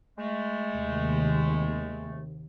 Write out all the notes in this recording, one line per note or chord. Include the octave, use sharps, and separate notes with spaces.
G#3 A3
D#2 C3